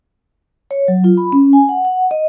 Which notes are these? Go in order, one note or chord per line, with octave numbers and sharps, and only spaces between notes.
C#5
F#3
F4
B5
C#4
G#5
F#5
F#5
D#5